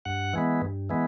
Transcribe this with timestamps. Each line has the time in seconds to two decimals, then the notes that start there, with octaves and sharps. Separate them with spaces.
0.05 G2 F#5
0.33 E3 G#3 B3
0.62 G2
0.90 E3 G#3 B3